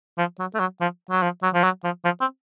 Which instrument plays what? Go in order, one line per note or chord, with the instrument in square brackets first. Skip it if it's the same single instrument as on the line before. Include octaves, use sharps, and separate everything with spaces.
[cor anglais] F3
F#3
A3
F#3
F3
F#3
F3
F#3
F3
F#3
F3
F3
C4